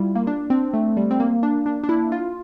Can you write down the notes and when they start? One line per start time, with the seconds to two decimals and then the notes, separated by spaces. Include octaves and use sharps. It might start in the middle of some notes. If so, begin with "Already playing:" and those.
Already playing: G3 E4 F4
0.15 A#3
0.27 D4
0.50 C4
0.73 A3
0.97 G3
1.11 C4
1.20 A#3
1.43 D4
1.66 D4
1.84 D4
1.89 E4
2.12 F4